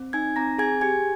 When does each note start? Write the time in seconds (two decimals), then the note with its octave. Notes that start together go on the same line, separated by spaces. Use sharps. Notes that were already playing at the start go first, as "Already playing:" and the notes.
Already playing: C4
0.13 D#4 G#5 G#6
0.36 C4 A#5 A#6
0.58 G#4 G#5 G#6
0.81 G4 G#5 G#6